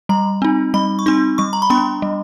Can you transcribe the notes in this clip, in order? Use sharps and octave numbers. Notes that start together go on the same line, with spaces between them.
G3 A#5
C4 D#4
G3 B5
C#6
C4 D#4 C6
G3 C#6
A#5
B5
B3 D4 C6
G3